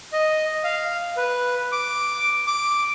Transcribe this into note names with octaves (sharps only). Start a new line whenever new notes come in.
D#5
F5
B4
D6
D6